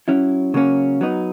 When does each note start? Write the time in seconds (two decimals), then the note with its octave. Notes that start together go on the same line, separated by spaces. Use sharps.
0.08 F#3 C#4 E4
0.54 C#3 F#3 A#3 C#4
1.01 F#3 B3 D#4